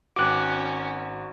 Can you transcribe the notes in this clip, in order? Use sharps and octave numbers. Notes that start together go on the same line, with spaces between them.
G#1 C#4 F#4 G5 D6 F#6